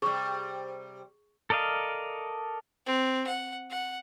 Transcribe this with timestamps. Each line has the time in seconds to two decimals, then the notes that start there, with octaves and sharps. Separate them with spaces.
0.02 C3 G3 G#4 C#6
1.50 A4 A#4 D5 D#5 F5
2.86 C4
3.27 F#5
3.70 F#5